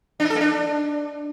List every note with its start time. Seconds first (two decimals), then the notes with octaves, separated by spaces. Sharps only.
0.20 D4
0.25 D#4
0.30 A4
0.35 A#3
0.41 D4